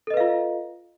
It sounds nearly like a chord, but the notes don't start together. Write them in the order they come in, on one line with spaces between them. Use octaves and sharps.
A4 D#5 B4 F5 F4